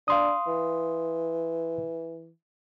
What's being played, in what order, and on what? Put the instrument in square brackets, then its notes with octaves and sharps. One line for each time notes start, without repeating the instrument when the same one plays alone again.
[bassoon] D4 [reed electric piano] F5 C6 D#6
[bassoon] E3